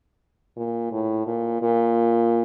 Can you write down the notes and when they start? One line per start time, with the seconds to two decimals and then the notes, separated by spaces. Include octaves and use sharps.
0.56 A#2
0.92 A2
1.27 A#2
1.62 A#2